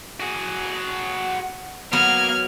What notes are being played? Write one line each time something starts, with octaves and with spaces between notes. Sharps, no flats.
F#4 G#4
F#3 A#3 B3 F5 F6 G#6